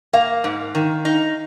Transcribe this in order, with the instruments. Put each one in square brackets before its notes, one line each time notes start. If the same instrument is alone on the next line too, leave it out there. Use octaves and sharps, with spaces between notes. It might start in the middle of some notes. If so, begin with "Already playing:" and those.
[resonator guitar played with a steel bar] A#3 [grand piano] F5
[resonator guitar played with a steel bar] G#2
D#3
D#4